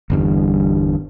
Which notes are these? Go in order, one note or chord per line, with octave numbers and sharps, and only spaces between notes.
G1 E2 G2